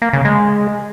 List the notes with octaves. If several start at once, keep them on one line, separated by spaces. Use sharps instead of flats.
A#3
C#3
G#3